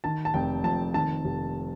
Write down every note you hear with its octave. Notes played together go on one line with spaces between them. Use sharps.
D#3 A5
A5
F1 G5
F2 A5
D#3 A5
F1